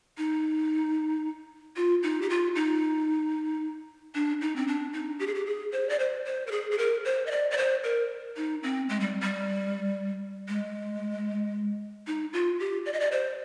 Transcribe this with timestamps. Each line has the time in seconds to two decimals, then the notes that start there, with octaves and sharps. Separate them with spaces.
0.18 D#4
1.76 F4
2.03 D#4
2.22 G4
2.30 F4
2.55 D#4
4.15 D4
4.41 D#4
4.56 C4
4.67 D4
4.94 D#4
5.19 G4
5.27 G#4
5.35 G4
5.46 G#4
5.72 C5
5.89 D5
5.99 C5
6.25 C5
6.47 A#4
6.51 G#4
6.71 G#4
6.78 A#4
7.05 C5
7.27 D#5
7.31 D5
7.51 D5
7.58 C5
7.84 A#4
8.37 D#4
8.63 C4
8.89 G#3
9.00 G3
9.22 G3
10.48 G#3
12.07 D#4
12.33 F4
12.60 G4
12.86 D5
12.93 D#5
13.00 D5
13.12 C5